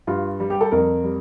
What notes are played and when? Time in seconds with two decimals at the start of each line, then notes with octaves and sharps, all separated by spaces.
0.07 G2 F4
0.40 G3
0.50 G4
0.61 A4
0.72 F2 A#4
1.04 G3